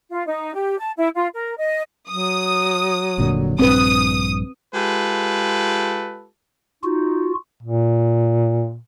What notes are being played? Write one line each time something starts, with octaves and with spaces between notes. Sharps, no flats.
F4
D#4
G4
A5
E4
F4
A#4
D#5
F#3 D#6
F1 A#2 D3
A#1 G2 C4 B4 D#6
G#3 F4 G4 A4 B4
D#4 F4 F#4
A#2